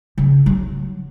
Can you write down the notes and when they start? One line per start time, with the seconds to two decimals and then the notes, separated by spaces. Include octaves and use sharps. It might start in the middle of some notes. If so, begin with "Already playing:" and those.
0.18 C#3
0.46 F#3